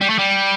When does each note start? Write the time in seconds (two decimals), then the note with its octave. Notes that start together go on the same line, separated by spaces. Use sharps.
0.01 G3
0.10 A3
0.19 G3